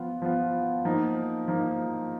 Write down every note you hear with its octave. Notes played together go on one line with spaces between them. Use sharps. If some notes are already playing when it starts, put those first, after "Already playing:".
Already playing: F3 B3 F4
F3 B3 F4
F3 A#3 D#4
F3 A#3 D#4